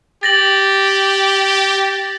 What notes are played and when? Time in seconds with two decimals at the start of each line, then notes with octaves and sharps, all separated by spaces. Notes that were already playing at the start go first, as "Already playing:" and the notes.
0.23 G4 A6 A#6 F#7